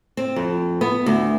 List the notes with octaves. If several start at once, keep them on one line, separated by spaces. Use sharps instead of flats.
C4
F2
B3
D2